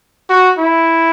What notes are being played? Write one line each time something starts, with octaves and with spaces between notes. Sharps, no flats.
F#4
E4